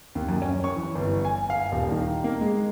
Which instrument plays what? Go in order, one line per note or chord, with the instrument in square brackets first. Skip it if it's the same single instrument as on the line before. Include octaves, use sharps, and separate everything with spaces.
[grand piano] D#2
F#2
C#4
C#6
E3
G1
G#5
F5
D#1
D#3
A#3
G#3